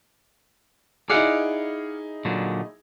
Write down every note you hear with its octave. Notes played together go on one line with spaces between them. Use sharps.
D#4 E4 G#4 D5 F5 F#5
A#2 D3 F#3